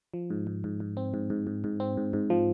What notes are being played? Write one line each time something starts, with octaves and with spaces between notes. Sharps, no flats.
F3
G#2
G#2
G#2
G#2
C4
G#2
G#2
G#2
G#2
C4
G#2
G#2
F3